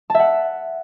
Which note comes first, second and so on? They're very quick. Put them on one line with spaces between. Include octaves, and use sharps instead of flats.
A5 E5 F#5